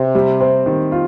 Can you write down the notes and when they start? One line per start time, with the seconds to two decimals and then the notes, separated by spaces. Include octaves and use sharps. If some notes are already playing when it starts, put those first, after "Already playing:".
Already playing: C3
0.15 G3
0.40 C4
0.66 D#3
0.92 F4